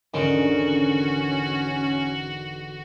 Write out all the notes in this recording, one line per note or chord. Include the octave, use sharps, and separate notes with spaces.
E1 G#2 D3 D#3 C#4 F#4